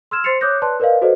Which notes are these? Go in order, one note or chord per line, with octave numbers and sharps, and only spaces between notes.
C6 E6 F6 G#6 E7
C5 C6 A6 C7 C#7 F7
C#5 D6 D#6 F#6 G6 A#6
B4 D5 A5 C6 F#6
A#4 B4 D5 D#5 F5
F#4 A4 B4 C5 D5 D#5